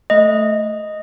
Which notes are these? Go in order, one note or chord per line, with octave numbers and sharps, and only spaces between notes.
A3 D#5